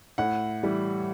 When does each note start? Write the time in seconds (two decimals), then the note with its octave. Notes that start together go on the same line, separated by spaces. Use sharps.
0.18 A2 F#5
0.63 E3 G3